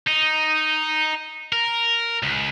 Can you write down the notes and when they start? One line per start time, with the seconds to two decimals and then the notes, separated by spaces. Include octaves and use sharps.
0.07 D#4
1.53 A#4
2.23 C#2